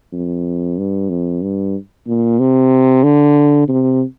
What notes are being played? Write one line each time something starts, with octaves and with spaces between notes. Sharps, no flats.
F2
G2
F2
G2
A#2
C3
D3
C3